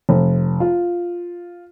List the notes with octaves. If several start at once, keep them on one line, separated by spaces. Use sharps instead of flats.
F1
F4